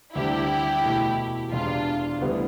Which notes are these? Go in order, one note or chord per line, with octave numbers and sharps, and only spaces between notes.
D2 C3 E3 G3 D4 E4 G4
E2 B2 A3
E1 E2 C3 E3 D4 F4
D2 D3 G3 B3 E4